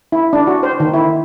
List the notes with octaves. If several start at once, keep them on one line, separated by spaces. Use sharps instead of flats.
E4
D4
F#4
C5
D#3
E4